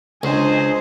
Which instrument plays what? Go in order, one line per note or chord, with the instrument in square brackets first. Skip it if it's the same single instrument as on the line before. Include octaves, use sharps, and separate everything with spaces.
[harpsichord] C#2 [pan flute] D4 [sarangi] C5 [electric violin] D#5 G#5